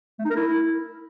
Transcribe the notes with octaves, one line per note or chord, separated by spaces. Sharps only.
A3
D#4
A#4
E4